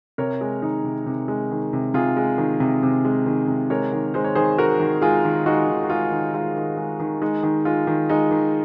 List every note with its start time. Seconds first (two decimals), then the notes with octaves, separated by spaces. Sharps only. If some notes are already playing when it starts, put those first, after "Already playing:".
0.18 C3 A#4 C#5
0.41 G#3
0.62 D#3 D#4
0.84 C3
1.06 C3
1.28 G#3
1.51 D#3
1.73 C3
1.94 C3 F4 G#4
2.17 G#3
2.38 D#3
2.60 C3
2.83 C3
3.05 G#3
3.26 D#3
3.48 C3
3.70 G#3 A#4 C#5
3.93 D#3
4.14 G#3 C5
4.24 C#5
4.35 D#3 G#4 C5
4.58 G#3 F#4 A#4
4.80 D#3
5.02 G#3 F4 G#4
5.25 D#3
5.46 G#3 D#4 F#4
5.68 D#3
5.84 F#4
5.90 G#3 F4
6.11 D#3
6.34 G#3 F4
6.57 D#3
6.77 G#3
6.99 D#3
7.22 G#3 D#4
7.43 D#3
7.65 G#3 F4
7.87 D#3
8.09 G#3 D#4
8.31 D#3